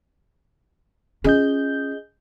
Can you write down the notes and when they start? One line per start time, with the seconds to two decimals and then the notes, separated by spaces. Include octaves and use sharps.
1.24 C#4 F4 G#4 D#5 G6